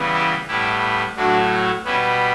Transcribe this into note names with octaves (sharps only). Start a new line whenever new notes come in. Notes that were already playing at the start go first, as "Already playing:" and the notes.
Already playing: C#3 E3 G3 B3
E4 G4
A2 G3 B3 E4 G4
A2 F#3 A3 D4 F#4
B2 G3 B3 C#4 E4